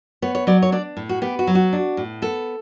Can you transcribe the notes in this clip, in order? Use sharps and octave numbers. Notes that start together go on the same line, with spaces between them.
B3 C#5
C#5
F#3 D5
C#5
D4 D5
A2
F#4
B3 G4
F#4
F#3
F#4
D4
A2
B3 A4